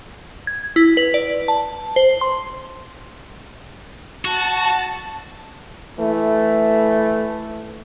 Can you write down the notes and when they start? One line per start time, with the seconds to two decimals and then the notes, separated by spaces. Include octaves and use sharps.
0.47 G#6
0.76 E4
0.97 B4
1.14 D5
1.48 A5
1.96 C5
2.21 C6
4.25 F#4 A5
5.99 E3 A3